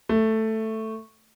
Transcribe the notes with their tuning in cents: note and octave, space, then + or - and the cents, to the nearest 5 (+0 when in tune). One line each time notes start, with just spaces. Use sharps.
A3 +5